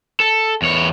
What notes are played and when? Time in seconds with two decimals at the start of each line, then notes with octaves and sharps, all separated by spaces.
0.20 A4
0.62 E2 C#5